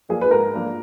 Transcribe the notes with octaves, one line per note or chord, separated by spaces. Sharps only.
F3 A#3 D4 G#4
B4
G#2 A#4
F3 A#3 D4